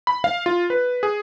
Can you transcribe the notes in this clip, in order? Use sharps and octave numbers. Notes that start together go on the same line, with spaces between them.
B5
F5
F4
B4
G#4